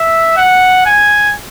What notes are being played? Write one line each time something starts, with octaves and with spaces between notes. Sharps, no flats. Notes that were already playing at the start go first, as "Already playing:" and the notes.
Already playing: E5
F#5
G#5